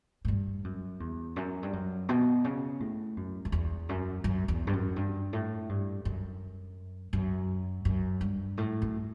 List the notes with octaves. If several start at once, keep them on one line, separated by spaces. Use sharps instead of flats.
A2
G2
F#2
E2
F#2
G2
F#2
B2
C#3
A2
F#2
F#2
E2
F#2
F#2
E2
G2
F#2
G2
A2
G2
F#2
F#2
F#2
G2
A2
F#2